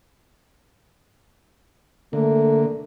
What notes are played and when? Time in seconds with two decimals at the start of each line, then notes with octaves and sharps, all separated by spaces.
2.13 D3 A3 A#3